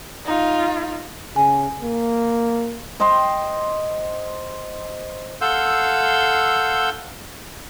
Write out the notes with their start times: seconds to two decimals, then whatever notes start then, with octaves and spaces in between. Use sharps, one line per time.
0.25 D#4 F4
1.36 C#3 G#5
1.82 A#3
3.00 C5 D#5 G5 C6
5.41 A4 F5 F#5 C6 E6 G6